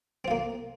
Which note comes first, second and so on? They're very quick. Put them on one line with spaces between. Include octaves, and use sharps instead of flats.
C4 F4 A#3